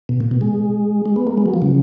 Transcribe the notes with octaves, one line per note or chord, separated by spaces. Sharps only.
B2
A#2
B2
G#3
G#3
B3
A#3
G#3
F#3
F3
C#3